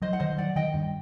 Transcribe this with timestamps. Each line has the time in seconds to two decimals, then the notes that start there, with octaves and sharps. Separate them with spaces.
0.02 F#3 C5 D#5
0.13 F#5
0.20 D#3 C5 D#5
0.38 F#3 D5 F#5
0.56 D#3 D#5 G5
0.74 G2